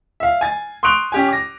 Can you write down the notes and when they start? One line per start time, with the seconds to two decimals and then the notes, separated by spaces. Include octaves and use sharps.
0.20 E5 F5
0.41 G#5 A6
0.83 C6 C#6 D#6 F#6 D7 F7
1.12 C#4 G4 G#5
1.28 D6 A#6